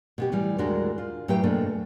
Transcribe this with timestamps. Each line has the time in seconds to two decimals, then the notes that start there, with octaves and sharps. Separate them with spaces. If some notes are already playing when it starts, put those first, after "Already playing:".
0.18 B2 B3 G4
0.32 A2 E3 G3
0.58 D#2 A2 G#3 D4 F#4 A#4
0.98 F4
1.28 A2 F#3 G4 B4 E5 G5
1.43 G#2 B2 A3 A#3 D4